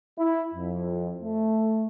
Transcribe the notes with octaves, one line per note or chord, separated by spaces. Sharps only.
E4
F2
A3